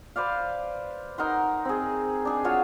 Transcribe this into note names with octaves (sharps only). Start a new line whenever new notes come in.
B4 C5 D5 F5
D#4 A#4 F#5 C6
C4 G#4
D4 G#4 C5
F4 F#4 C#5 D#5